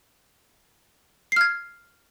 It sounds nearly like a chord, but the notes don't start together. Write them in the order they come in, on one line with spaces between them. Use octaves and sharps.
C7 F6 G#6